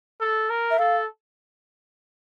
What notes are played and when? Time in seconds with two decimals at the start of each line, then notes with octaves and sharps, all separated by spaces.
0.20 A4
0.49 A#4
0.71 E5
0.79 A4 F5